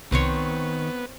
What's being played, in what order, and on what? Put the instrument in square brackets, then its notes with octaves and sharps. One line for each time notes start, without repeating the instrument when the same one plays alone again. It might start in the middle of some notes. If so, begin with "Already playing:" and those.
[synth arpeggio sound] C2 [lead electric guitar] D#3 [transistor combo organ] B3 [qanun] C4 C5 C#5